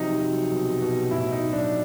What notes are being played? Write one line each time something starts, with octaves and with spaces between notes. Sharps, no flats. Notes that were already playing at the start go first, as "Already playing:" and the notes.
Already playing: C3 F3 F#3 D#4
F#3
B2
B2
A2 E4
D#4
F#3
D4